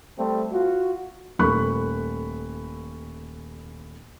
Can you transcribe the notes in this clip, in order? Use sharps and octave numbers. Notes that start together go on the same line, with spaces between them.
G3 A3 C4
F4 F#4
D#1 A3 A#4 B5 C#6 F#6